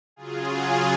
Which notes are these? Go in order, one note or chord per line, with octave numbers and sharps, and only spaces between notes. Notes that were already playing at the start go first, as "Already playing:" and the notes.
C#3 F#3 F4 G#4